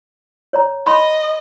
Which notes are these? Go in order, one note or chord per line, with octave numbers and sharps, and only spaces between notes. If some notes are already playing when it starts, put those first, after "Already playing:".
C#5 D5 A#5
D#5 B5 C6